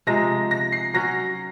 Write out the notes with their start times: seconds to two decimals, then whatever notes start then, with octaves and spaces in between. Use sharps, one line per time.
0.07 C3 F3 G#3 D#4 A#6
0.51 A#6
0.72 C7
0.94 F#3 C#4 F#4 A#6